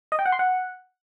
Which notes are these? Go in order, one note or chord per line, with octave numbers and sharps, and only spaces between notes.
D#5
G5
F#5
C6
F#5